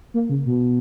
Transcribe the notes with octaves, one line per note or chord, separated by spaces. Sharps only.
A#3
C#3
B2